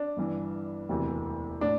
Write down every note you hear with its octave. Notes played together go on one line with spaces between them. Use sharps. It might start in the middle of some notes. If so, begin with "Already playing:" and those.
Already playing: D4
G1 G2 E3
E1 D2 C3 E3
A2 D4